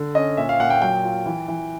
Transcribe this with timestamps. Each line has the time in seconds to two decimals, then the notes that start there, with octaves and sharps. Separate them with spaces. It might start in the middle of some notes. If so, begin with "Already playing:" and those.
Already playing: D3
0.15 C#4 D#5
0.37 A#2 E5
0.49 F5
0.60 A#2 F#5
0.70 G5
0.82 F#3 G5
1.04 F4
1.26 E3
1.48 E3